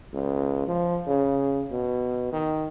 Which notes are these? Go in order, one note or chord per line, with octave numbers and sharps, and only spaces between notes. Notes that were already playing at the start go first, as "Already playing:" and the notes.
C#2
F3
C#3
B2
D#3